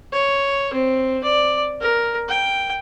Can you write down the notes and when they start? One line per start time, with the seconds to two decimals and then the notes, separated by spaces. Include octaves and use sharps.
0.13 C#5
0.74 C4
1.24 D5
1.81 A#4
2.29 G5